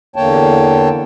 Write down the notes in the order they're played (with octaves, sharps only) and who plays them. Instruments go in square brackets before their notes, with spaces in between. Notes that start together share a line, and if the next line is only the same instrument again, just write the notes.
[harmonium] E2 D3 A#3 C#5 G5 A5